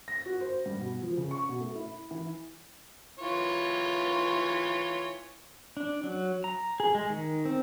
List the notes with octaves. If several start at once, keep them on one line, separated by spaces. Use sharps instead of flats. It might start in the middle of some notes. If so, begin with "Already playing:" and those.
A#6
F#4
C5
G2
B2
F3
C#3
C#6
B2
A3
E4
E3
E3 F4 C#5
D4
F#3
A#5
G#4
G#3
D#3
C4